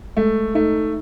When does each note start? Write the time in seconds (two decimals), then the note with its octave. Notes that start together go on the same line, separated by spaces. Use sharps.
0.17 G#3 A3
0.55 A3 D#4